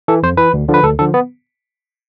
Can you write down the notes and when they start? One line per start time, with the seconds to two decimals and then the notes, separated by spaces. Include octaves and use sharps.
0.08 E3 A4
0.23 F2 C5
0.37 E3 B4
0.53 D2
0.68 D3 F3
0.74 B4
0.83 D2 A4
0.99 D3 F3 A4
1.14 B3